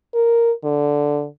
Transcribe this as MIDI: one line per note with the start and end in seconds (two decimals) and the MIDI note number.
0.14 0.52 70
0.64 1.27 50